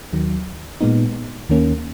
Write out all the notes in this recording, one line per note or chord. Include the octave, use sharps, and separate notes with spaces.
D#2 D#3 F#3
A#2 G#3 B3 D#4
D#2 D#3 A#3 C#4